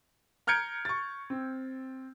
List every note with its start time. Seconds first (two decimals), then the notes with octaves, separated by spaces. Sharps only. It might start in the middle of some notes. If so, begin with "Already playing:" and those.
0.47 A#5 F6 G6 G#6 C#7 D7
0.85 C#6 A6
1.30 C4